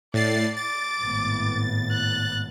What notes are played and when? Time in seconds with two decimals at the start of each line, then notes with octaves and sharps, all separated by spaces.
0.14 A2 D5 A6 C7
0.57 D6 A6
0.99 G#1 A2 B3
1.92 F#6